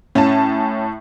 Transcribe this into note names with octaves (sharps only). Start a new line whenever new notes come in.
A2 C#4 A5